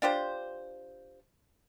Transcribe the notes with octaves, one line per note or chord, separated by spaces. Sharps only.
D4 F4 G4 C5